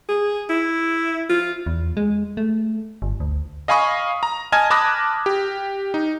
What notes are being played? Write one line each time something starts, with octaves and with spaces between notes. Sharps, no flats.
G#4
E4
F4
E2
G#3
A3
G1
D2
D#5 F5 G#5 B5 C#6 D#6
A#5
D#5 G#5 A5 F6 G#6 A#6
A5 B5 D6 D#6 F#6 A#6
G4
D#4